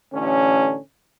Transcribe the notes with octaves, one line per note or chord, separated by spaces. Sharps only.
A1 D3 C#4